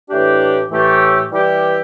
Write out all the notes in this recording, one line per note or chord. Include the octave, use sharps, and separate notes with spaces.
A2 E3 A3 D4 G4
A2 E3 A3 G4
E3 G3 E4 G4